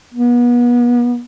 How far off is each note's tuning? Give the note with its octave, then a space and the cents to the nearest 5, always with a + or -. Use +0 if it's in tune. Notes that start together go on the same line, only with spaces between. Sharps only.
B3 -35